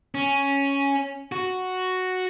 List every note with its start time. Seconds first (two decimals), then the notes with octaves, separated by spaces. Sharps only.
0.15 C#4
1.32 F#4